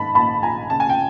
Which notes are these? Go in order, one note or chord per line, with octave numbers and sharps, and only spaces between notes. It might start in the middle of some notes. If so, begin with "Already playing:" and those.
Already playing: G#2 D#3 A5 B5
A#1 A5 B5
A#1 G#5 A#5
C#3 A5
G#5
G5